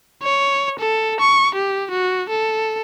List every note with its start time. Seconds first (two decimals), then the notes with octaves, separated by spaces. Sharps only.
0.22 C#5
0.79 A4
1.20 C#6
1.55 G4
1.91 F#4
2.29 A4